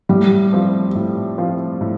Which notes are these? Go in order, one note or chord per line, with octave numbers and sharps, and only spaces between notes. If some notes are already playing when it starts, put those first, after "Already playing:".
A2 G3
F3 C4 F4
A2
F3 C4 F4
A2